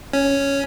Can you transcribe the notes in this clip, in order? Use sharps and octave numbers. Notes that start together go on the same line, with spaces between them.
C#4